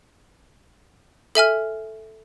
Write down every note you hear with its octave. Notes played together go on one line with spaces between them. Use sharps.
A4 E5 G#5 F6